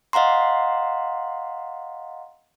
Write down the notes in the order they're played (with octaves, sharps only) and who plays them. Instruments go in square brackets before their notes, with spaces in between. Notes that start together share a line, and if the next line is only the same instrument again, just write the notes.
[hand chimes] D#5 F5 F#5 A#5 C6